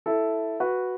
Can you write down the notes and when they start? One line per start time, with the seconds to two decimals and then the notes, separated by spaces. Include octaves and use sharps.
0.06 E4 A4
0.60 F#4 B4